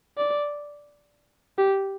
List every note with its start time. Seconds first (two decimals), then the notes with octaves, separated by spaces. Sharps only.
0.17 D5
1.58 G4